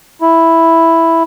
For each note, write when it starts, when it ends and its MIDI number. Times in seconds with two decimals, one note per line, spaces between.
0.21 1.23 64